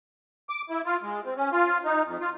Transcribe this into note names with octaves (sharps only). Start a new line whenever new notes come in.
D6
E4
F4
G#3
C4
C#4
F4
D#4
F2
F4